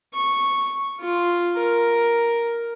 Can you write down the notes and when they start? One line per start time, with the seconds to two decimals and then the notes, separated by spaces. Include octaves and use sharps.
0.13 C#6
1.00 F4
1.57 A#4